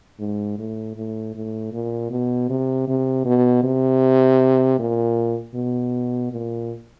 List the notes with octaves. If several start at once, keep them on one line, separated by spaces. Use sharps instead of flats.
G#2
A2
A2
A2
A#2
B2
C3
C3
B2
C3
A#2
B2
A#2